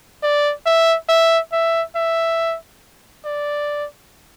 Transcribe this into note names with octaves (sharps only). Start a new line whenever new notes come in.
D5
E5
E5
E5
E5
D5